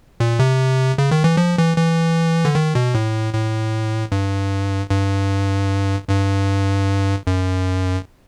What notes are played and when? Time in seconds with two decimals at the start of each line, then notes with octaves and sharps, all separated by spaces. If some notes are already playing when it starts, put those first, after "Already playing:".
0.20 A#2
0.39 C3
0.98 C#3
1.11 D#3
1.24 E3
1.37 F3
1.58 E3
1.77 E3
2.45 D3
2.55 D#3
2.75 B2
2.94 A2
3.34 A2
4.12 G2
4.90 G2
6.09 G2
7.27 F#2